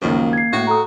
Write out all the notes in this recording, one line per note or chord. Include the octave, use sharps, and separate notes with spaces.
C#2 F#2 D#3 F3 A#3
G#6 C7
A2 F#4
A4 A#5 D#6